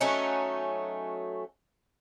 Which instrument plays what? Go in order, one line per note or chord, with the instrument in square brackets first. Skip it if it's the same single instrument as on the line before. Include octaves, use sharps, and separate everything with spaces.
[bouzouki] F#3 A3 C#4 D#4